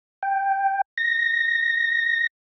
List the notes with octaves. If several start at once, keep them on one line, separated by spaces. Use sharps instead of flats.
G5
A#6